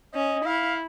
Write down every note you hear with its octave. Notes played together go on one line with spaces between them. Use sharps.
C#4 D#5
E4 F5